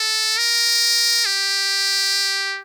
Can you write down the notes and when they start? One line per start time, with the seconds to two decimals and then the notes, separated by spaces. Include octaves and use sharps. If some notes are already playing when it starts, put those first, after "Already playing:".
Already playing: A4
0.38 A#4
1.26 G4